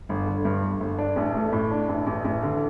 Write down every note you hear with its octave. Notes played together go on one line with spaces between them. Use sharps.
G1
D3
G2
G1
G1
D4
A1
A3
A2
D4
A1
A1
A1
D3